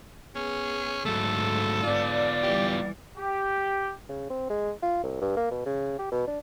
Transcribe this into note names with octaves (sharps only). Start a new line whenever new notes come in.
B3 C#4 G#4
G#2 F#3 A3 A4
B3 F4 D5
E3 G3 G4
G4
C#3
C4
G#3
F4
C2
G2
A#3
B2
C#3
G4
B2
D4